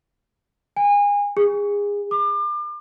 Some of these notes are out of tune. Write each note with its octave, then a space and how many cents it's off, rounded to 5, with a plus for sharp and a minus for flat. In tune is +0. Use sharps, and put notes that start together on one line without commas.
G#5 -30
G#4 -25
D6 +35